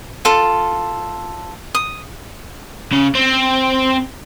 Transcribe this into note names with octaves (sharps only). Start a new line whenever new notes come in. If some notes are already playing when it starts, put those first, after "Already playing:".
F4 A4
D#6
C#3
C4